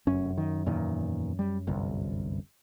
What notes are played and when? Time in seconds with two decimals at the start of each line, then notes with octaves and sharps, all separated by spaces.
0.07 F1 F#2 C#4
0.38 D#3
0.66 E2 A#2 D#3
1.39 G3
1.67 G1 C2